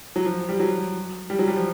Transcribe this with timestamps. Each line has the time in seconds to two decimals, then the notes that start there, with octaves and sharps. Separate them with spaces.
0.16 F#3
0.25 F3
0.49 G3
0.60 F#3
1.30 G3
1.39 F#3
1.48 G3
1.56 F3